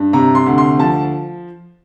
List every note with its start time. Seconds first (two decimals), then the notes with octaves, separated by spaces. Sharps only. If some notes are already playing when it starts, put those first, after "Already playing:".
Already playing: G2
0.13 C3 A#5
0.35 C6
0.46 D2
0.58 C6
0.79 F3 A5